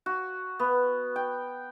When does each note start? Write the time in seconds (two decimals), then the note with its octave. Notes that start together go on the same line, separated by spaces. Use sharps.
0.06 F#4
0.59 B3
1.16 G5